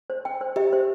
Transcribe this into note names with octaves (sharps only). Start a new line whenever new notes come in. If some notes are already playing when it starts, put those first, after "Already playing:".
C5
G5
C5
G4 E5
C5